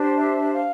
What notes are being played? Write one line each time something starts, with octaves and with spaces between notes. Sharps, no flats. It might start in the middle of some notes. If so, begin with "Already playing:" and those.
Already playing: D4 G4 C5
E5
F5